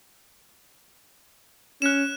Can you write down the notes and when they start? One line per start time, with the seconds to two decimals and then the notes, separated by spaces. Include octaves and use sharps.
1.82 C#4 F#6 E7